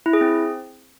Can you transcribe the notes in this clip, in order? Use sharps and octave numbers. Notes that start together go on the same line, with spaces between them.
E4
G#4
C4